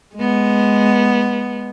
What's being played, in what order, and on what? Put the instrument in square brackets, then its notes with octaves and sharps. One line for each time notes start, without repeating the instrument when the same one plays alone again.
[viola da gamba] G#3 B3